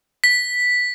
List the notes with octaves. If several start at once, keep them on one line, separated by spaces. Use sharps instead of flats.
B6